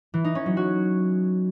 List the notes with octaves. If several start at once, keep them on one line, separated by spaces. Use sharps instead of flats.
E3
D#4
C#4
F#3
F#4